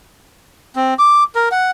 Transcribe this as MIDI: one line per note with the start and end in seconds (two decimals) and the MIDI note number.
0.76 0.94 60
0.99 1.24 86
1.35 1.49 70
1.52 1.71 78